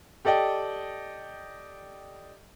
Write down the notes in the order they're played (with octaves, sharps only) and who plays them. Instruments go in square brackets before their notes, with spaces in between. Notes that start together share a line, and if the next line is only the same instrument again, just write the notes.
[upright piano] G4 A4 D5 D#5 G5